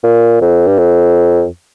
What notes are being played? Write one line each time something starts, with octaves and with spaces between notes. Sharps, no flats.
A#2
F2
G2
F2